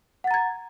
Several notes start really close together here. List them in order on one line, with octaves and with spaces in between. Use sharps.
F#5 A6 A#5 G#6